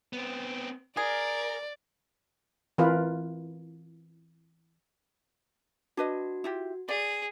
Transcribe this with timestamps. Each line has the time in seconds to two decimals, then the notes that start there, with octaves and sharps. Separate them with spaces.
0.13 B3 C4
0.97 G#4 A#4 D5
2.78 E3 C4 F4 A#4 B4
5.97 D4 F#4 B4 D#5
6.44 E4 F4 G4
6.89 G#4 D5